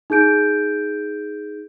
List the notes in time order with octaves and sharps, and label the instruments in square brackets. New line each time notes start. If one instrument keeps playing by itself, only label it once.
[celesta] D#4 G#4 G6 D7